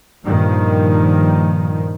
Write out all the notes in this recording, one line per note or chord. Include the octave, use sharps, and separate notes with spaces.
G2 A#2 D#3 F3